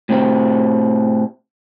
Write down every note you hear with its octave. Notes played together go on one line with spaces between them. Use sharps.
A2 C3 C4